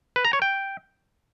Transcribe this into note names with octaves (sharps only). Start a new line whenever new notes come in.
B4
A#5
C#5
G5